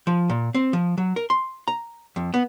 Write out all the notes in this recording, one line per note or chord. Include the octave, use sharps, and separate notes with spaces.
F3
A#2
C4
F3
F#3
A#4
C6
A#5
F2
B3